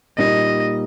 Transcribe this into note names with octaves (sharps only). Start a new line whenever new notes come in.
A#2 G3 A#3 D#4 D#5